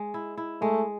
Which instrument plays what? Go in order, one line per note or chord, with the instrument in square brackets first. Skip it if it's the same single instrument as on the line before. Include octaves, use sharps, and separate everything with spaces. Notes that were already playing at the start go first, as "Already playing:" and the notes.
Already playing: [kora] G#3
E4
E4
[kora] G#3 [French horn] A3